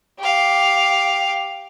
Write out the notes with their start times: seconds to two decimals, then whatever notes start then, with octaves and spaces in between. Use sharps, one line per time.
0.19 G4 F5